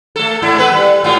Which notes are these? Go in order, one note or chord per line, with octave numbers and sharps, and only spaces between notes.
A3 A4
G#2 E4
A3 B3 B4
G3
G#2 F4